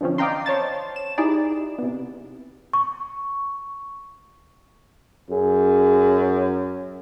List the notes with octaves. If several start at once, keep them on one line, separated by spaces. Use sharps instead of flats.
D3 E3 F3 C4 C#4
D5 D#5 F5 G5 A#5 C6
C5 C#5 A5 A6
E7
D#4 E4 G4 G#4 D5
C3 B3
C#6
F#2 G#4